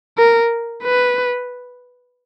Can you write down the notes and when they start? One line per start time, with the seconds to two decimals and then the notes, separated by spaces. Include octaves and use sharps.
0.18 A#4
0.83 B4